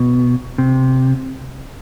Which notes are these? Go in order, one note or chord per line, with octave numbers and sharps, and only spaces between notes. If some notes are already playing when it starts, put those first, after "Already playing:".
Already playing: B2
C3